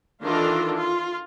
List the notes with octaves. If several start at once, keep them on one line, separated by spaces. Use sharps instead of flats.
D#3 E3 D4 F4 A4 A#4
F4